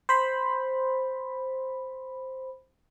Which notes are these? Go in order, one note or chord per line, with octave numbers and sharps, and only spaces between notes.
C5 B5